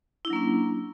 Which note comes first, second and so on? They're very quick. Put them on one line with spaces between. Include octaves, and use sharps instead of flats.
E4 D4 F#3 A#3 C#4